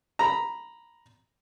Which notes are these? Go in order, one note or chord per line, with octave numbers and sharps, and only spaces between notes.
A#5 B5